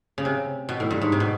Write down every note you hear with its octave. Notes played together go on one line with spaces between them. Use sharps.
C#3
C3
B2
A2
G2
G#2
C3
B2